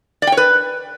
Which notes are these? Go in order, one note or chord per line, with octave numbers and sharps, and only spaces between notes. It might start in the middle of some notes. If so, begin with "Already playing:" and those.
D5
G5
C#5
B4